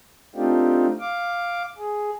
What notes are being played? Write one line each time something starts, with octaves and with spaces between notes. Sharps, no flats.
A3 C4 D4 D#4 F4 G4
F5 D6
G#4